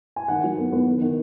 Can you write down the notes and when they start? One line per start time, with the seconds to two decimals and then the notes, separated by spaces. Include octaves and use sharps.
0.16 G#5
0.28 D#3 F#5
0.44 F#3
0.58 B3
0.72 B3
0.87 D#3
1.02 D#3